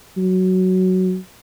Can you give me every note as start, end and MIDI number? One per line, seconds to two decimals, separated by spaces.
0.17 1.16 54